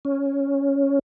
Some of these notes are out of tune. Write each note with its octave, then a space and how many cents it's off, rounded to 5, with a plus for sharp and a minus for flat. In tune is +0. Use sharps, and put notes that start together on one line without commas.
C#4 +0